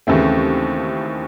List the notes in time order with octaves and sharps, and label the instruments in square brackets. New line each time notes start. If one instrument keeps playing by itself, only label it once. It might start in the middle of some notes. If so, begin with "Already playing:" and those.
[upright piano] D#2 C#3 E3 A3 C4